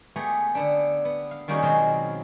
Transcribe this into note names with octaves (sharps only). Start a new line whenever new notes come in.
A3 B3 G4 G#4
D3 B3 D4
B3
F5
D#3 G3 A#3 C#4 F#4 G#4
B2 D#3 F#3 G#3 C4 F4